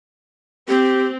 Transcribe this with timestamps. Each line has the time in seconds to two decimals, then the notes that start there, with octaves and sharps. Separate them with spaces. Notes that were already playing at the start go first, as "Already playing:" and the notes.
0.68 C4 G4